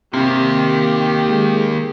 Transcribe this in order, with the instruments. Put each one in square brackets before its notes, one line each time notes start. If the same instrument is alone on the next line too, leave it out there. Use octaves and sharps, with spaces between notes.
[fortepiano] C3 [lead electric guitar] D#3 A#3 [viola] G4
[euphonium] G#3